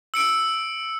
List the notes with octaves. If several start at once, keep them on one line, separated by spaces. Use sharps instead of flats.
E6 C#7 D7